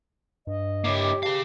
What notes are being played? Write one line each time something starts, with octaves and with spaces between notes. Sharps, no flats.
G2 D#5
A#3 E4 G4 C#5 D6
G4 G#4 B4 F5 A5